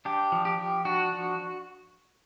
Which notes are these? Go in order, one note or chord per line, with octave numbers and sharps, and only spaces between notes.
D4 G4
F3
G4
F3
D4 F#4
F3